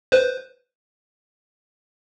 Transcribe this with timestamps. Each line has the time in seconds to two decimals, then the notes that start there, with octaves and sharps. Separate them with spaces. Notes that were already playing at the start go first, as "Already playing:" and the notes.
0.12 B4 C5